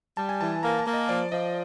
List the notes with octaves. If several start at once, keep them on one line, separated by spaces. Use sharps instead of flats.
G3 A5
G#5
E3 A5
A#3 A#5
A5
A#3
D#5
F3 D5
F3 D#5